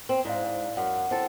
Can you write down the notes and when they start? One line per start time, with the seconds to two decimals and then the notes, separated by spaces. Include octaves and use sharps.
0.09 C4
0.25 G#2 E4 D5 F5
0.77 F#2 F#5
0.93 F#5
1.11 C4 E4 A4